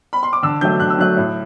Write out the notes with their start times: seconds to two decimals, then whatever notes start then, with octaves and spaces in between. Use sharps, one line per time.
0.13 B5
0.23 C6
0.33 D6
0.43 D3 E6
0.61 F#3 A3 G6
0.80 D3 F#6
0.90 E6
0.98 F#3 A3 F#6
1.17 A2